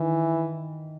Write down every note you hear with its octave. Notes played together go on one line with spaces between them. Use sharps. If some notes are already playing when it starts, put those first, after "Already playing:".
Already playing: D#3 E3